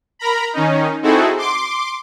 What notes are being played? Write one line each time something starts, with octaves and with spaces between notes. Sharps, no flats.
A#4 A#5 B5
D#3 C#4 D#4
C4 D#4 E4 F#4 G#4 A4
C6 D6